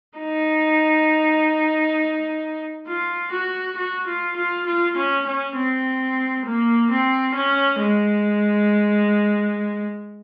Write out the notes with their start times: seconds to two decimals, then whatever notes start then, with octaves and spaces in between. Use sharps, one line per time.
0.19 D#4
2.87 F4
3.32 F#4
3.77 F#4
4.07 F4
4.36 F4
4.66 F4
4.96 C#4
5.26 C#4
5.56 C4
6.46 A#3
6.90 C4
7.35 C#4
7.80 G#3